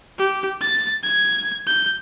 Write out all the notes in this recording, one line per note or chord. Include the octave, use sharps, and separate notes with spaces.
G4
A6
G#6
G6